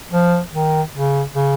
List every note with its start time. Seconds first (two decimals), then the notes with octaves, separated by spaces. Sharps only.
0.11 F3
0.53 D#3
0.94 C#3
1.35 C#3